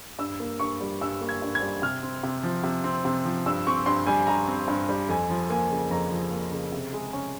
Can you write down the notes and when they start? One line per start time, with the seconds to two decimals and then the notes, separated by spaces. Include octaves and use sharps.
0.19 G2 E6
0.40 A#3
0.59 G2 C#6
0.81 G3
1.01 G2 E6
1.21 A#3
1.29 G#6
1.42 G2
1.55 G#6
1.61 G3
1.82 C3 F6
2.03 C4
2.23 C3
2.43 F3
2.64 C3
2.84 C4
3.05 C3
3.25 F3
3.46 G2 E6
3.67 C4 C#6
3.86 G2 C6
4.07 G3 G#5
4.27 G2 A#5
4.48 C4
4.68 G2
4.89 G3
5.09 F2 G#5
5.30 F3
5.50 A#3 G#5
5.71 C#3
5.90 F2 A#5
6.12 F3
6.31 A#3
6.51 C#3
6.72 C3
6.93 G#3
7.13 C#4